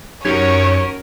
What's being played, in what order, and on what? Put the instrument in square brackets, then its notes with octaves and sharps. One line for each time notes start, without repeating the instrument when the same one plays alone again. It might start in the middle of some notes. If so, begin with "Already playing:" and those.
[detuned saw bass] F#2 [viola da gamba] C#4 F#4 A#4 [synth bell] D#4 G4 G#6 [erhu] C#5